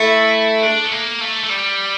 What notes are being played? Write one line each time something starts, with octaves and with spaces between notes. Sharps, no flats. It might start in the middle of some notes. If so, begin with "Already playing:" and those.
Already playing: A3 E4
D4
A3
A#3
A3
A3
G3